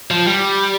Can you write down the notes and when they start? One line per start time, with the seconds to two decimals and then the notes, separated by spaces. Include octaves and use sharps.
0.11 F3
0.27 G3